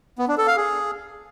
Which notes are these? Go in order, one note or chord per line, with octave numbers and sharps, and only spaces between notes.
B3
D4
A4
F5
G#4